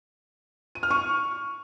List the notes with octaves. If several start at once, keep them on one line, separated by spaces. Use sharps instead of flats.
D#7
F6
C#6